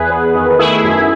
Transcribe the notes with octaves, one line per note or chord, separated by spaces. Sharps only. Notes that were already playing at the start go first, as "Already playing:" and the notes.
Already playing: E2 G#4 B4
B3
D#3
A3 E4 G#4
F#2